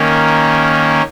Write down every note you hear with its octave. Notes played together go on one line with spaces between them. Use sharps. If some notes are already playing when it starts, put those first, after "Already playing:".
Already playing: D#3 A#3 C#4